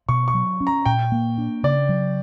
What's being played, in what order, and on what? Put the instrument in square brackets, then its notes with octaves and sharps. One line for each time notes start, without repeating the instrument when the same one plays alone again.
[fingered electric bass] B2 [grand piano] C#6
[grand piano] C#6
[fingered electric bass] F#3
C#4
[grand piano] A#5
[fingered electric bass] A#2 [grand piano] G5
[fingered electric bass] A#3
D4
[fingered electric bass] C#3 [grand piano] D5
[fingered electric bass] F#3